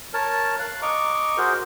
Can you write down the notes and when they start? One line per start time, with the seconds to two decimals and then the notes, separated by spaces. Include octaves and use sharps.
0.14 A#4 C#5 A5
0.59 F5 F#6
0.82 D#5 A#5 C#6 D6
1.38 F#4 G#4 A#4 C5